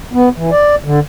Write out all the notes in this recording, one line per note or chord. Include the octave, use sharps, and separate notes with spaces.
B3
E3
D5
D3